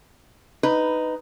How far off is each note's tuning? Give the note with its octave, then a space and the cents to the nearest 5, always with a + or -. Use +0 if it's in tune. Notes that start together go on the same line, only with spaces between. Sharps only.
D#4 +0 B4 +10